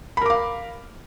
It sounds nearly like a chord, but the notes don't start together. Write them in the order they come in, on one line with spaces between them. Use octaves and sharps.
B5 A#4 D6 F5